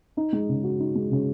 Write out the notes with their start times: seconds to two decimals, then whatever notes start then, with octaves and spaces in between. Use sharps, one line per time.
0.17 D#4
0.33 G#3
0.49 C#3
0.64 F#4
0.80 D#4
0.95 G#3
1.11 C#3